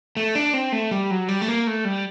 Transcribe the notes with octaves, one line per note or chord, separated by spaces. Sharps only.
A3
D4
C4
A3
G3
F#3
G3
A3
A#3
A3
G3